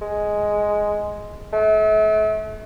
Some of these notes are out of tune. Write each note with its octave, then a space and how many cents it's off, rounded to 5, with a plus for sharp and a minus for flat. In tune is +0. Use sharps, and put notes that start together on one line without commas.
G#3 +5
A3 -40